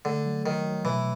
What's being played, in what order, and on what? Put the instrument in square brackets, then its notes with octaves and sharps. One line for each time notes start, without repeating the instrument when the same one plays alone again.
[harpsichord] D3 [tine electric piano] A3
[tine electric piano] F#3
[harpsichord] D#3 [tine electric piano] F#3
[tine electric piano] F#3
[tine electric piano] B2 [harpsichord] E3